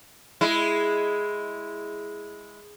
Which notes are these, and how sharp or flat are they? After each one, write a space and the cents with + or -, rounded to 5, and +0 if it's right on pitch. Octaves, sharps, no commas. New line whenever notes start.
G#3 +0 E4 +5